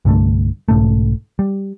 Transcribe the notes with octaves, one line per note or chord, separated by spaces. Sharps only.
C2 G2 D3 A3
B1 G#2 C#3 A3
G3